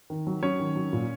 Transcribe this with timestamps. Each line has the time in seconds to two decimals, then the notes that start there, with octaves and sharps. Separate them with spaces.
0.10 D#3
0.27 F#3
0.42 F#3 C#4 C#5
0.60 D#3
0.76 F#3
0.93 A#2